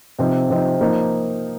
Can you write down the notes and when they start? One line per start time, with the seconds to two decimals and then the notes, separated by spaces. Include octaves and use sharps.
0.19 C3 F3 C4 D#4
0.50 C3 F3 C4 D#4
0.81 F3 A#3 D#4